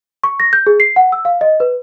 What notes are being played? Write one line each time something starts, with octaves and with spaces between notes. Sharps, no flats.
C#6
A#6
G6
G#4
C7
F#5
E6
F5
D#5
B4